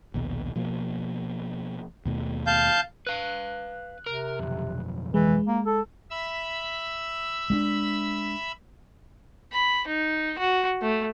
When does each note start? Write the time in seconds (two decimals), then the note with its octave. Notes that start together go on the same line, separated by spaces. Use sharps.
0.14 A#1 D#2 B2
0.56 B2 F3 A#3
2.05 D#2 B2 A3
2.47 F5 A5 G6
3.07 B4 F5 F#6
4.06 C3 A#4
4.39 B1 F2
5.14 E3 G#3
5.48 A#3
5.66 A4
6.10 E5 B5 E6
7.50 G#3 C#4 D4
9.53 B5
9.87 D#4
10.38 F#4
10.82 A3